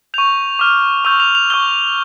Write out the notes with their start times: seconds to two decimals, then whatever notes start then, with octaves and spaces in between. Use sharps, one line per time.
0.14 C#6 G6 F7
0.59 D6 F6
1.05 C#6 E6 G6 F7
1.20 F7
1.35 F7
1.50 C#6 E6 G6 G7